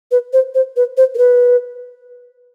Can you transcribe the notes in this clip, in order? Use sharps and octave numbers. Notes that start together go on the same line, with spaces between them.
B4
C5
C5
B4
C5
A#4
B4